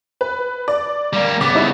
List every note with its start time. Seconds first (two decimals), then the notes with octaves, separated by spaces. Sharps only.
0.21 B4
0.68 D5
1.13 G3 A#3
1.41 C#3 B3 D6
1.55 G3 D#4 E4